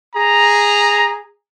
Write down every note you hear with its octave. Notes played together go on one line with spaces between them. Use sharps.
G#4 A#5